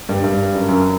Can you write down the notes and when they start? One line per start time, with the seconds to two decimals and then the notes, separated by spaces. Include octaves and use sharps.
0.09 G2
0.24 G2
0.55 F#2
0.69 F#2